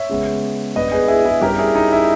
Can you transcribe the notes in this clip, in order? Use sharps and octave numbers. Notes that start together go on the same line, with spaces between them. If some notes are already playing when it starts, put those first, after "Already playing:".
Already playing: C#5 E5
C#3 G#3 B3
G2 G3 B3 B4 D#5
G#4 B4
E4 G#4
E4 G#4
G2 G3 C#4 G4 A#4
E4 G#4
D#4
E4